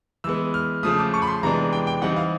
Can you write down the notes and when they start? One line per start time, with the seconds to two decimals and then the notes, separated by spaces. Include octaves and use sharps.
0.24 E3 G#3 B3 E6
0.54 F6
0.83 C#3 F3 A3 D#6
0.99 D6
1.14 C#6
1.22 B5
1.27 C6
1.43 C3 E3 G#3 B3 D4 A#5
1.73 G5
1.87 G5
2.02 E3 G3 C4 D#4 F#5
2.16 F5